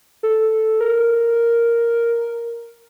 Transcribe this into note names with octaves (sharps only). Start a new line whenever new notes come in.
A4
A#4